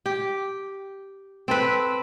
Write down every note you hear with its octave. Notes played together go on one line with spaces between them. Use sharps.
G4
C4 A4 B4